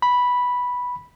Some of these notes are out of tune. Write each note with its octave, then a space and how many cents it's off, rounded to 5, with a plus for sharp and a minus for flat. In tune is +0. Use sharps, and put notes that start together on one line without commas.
B5 -5